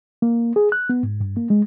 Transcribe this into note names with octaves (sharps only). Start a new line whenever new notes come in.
A#3
G#4
F#6
B3
G#2
G2
A#3
G#3